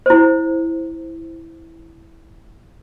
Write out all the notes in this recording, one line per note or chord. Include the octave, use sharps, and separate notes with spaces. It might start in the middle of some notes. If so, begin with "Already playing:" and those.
E4 C5